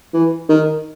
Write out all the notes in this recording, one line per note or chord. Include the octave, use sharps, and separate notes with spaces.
E3
D#3